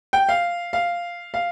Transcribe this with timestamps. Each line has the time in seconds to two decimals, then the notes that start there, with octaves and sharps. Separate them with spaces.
0.13 G5
0.29 F5
0.73 F5
1.34 F5